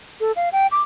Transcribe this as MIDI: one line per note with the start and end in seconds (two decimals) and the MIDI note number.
0.20 0.32 69
0.36 0.49 77
0.53 0.67 79
0.72 0.81 86